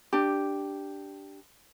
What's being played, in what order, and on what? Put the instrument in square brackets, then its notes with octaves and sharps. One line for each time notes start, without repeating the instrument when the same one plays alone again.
[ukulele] D4 G4